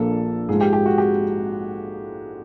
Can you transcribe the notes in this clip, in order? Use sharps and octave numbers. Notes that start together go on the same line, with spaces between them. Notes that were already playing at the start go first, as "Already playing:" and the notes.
Already playing: A#1 A#2 F3 A#3 D4 A4
G#2 F3 G#3 G#4
G4
G4
F#4
G4